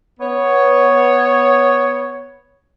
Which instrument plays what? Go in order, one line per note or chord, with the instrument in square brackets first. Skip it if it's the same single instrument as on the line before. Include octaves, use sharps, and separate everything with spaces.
[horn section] B3 C#5